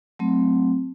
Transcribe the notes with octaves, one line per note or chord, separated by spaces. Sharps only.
F#3 A3 C4